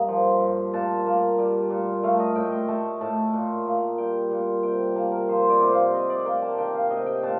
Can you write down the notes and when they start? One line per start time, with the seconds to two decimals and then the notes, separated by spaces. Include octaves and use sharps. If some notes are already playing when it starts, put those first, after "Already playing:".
Already playing: G2 A#3 D#5
0.08 F3
0.40 G2
0.73 A#2 A5
1.06 A#3
1.38 G3
1.70 A#2
2.03 A3 F5
2.19 D#5
2.35 A2 G5
2.52 G5
2.68 A3 A5
3.01 A2 A5
3.33 A#2
3.66 A#3
3.98 G3 G5
4.31 A#2
4.63 C3 G5
4.79 G5
4.96 A#3 A5
5.12 A#4
5.28 F3 C5
5.40 C5
5.50 D5
5.60 C3
5.72 F5
5.93 C3 D#5
6.09 D5
6.25 A#3 G5
6.42 A5
6.58 D#3 G5
6.74 F5
6.90 C3 D#5
7.06 G5
7.23 A#2 A5